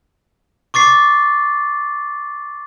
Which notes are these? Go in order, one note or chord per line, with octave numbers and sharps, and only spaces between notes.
C#6 D6 A6 C7